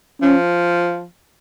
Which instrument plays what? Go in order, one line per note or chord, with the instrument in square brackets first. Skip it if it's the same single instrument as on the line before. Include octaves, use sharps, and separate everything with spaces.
[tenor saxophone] F3 [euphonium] C#4